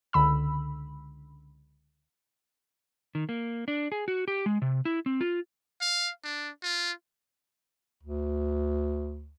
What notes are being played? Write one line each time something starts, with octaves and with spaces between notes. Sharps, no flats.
C#2 D3 B5 E6
D#3
A#3
D4
G#4
F#4
G4
G#3
C3
E4
C4
F4
F5
D4
F4
D2